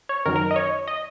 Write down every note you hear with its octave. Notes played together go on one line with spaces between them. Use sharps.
C#5
F#2 D#3 F#3 A#4
A#4
D#5
C#5
D#5